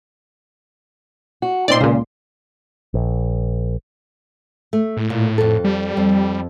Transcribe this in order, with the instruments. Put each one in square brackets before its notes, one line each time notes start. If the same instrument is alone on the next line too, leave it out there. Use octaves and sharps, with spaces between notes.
[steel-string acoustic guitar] F#4
[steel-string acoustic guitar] A#2 C4 D#4 [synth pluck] D5 C6
[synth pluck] C#2 A#2 [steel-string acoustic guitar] C#3
[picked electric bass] A#1
[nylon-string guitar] A3
[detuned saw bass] A2
[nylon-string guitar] A#2
F2 A4
[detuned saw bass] G3
[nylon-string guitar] F2